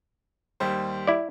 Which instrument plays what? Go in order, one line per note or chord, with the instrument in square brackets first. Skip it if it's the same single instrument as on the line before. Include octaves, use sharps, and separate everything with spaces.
[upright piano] D#2 G3 C5
[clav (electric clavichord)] E4 D5